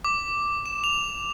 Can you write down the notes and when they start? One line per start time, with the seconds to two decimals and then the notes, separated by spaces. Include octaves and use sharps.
0.04 D6
0.66 E7
0.84 F7